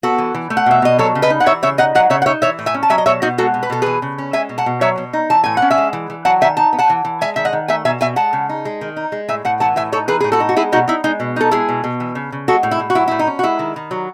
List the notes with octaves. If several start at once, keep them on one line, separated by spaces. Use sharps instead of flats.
B3 F#4 A4
E3
E3
A3
F#5
B2 E5
B2 D#5
F#3 A4 C#5
C#3
B4 D#5
D#4
F#5
E3 C#5 E5
C#3 C#5 E5
D#4 D#5 F#5
F#3 D#5 F#5
C#3 C#5 E5
F#5
D#4 C#5 E5
E3 C#5 E5
A2
E5 G#5
C#4
A5
F#3 E5 G#5
D#5
B2 C#5 E5
B2 D#4 F#4
G#3 F#4 A4
B2
B4
B2 A4
E3 G#4 B4
C#3
C#4
G#3 E5 G#5
B2
F#5 A5
B2
F#3 C#5 E5
B2
D#4
E3 A5
A2 G#5
F#5
C#4
E5 G#5
G#3
E3
E3
F#3 F#5 A5
D#3 E5 G#5
D#4 A5
B3
F#5 A5
E3
E3
G#3 E5 G#5
D#3 E5
D#5 F#5
D#3
A3 E5 G#5
B2 E5 G#5
B2 E5 G#5
G#3 F#5 A5
C#3
D#4
G#3
D#3
D#4
G#3
A2 E5 G#5
A2 F#5 A5
E3 F#5 A5
A2 E5 G#5
D#4 A4 C#5
E3 G#4 B4
A2 G#4
F#4 A4
D#4
F#4
G#3 E4 G#4
B2 D#4 F#4
D#4 E4
G#3 D#4
B2
D#4 A4
G#3 E4 G#4
B2
B2
E3
C#3
C#3
G#3 F#4 A4
A2
E4
A2
F#4
F#3 E4
A2 E4
D#4
C#4
F#4
G#3 E4
D#3
D#3
F#3